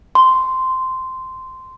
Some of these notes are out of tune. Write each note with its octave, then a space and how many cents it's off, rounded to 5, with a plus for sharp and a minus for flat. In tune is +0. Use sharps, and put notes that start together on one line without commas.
C6 -10